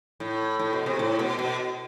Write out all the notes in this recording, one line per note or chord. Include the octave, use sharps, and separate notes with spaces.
A2
A2
B2
C3
A2
B2
B2